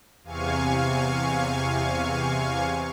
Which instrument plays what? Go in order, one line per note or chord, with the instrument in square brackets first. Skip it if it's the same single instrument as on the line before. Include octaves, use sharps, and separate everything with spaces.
[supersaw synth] E2 C3 F5 G#5 C#6